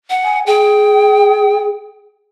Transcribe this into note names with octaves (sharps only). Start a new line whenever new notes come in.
F#5
G#5
G#4 G5